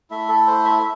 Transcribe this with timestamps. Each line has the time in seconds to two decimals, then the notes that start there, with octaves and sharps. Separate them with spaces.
0.10 A3 E4 E5
0.28 A4
0.47 C5
0.65 E5